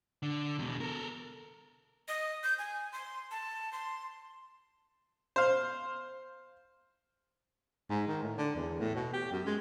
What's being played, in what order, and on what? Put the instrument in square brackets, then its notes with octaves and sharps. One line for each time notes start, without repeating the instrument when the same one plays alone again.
[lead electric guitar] D3
E2 B2
A4 A#4
[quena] D#5
G6
G#5
C6
A5
C6
[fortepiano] C5 F5
[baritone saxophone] G#2
D#3
A2
D3
E2
A2
B2
G4
F#2
G#3